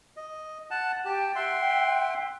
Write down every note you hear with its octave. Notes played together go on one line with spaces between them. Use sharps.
D#5
F#5 A5
G4 G5 A5
E5 F#5 C6